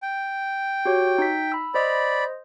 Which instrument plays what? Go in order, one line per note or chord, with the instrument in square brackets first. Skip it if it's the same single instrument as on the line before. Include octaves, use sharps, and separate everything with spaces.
[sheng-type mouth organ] G5
[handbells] F#4 G4 C#5
D#4 B6
B5 E6
[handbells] C5 D#5 [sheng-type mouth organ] D5 B5